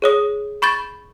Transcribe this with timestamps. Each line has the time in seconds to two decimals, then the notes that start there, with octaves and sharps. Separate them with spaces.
0.02 G#4 C#5 D#6
0.62 B5 C#6 G6 A6